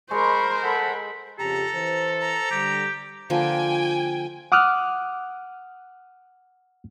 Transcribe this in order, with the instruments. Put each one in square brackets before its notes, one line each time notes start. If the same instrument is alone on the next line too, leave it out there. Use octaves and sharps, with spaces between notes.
[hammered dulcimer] G#3 [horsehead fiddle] A#4 C5 [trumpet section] B5 C#6
[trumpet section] A4 F#5 B5
[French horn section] F2 C#3 G4 [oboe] A4 [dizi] A#5
[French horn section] E3 C5
[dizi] A#5
[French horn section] D3 G3 [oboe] G4
[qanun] D3 F3 A#3 [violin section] G5 G#5
[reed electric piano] F#5 D6 D#6 F6 F#6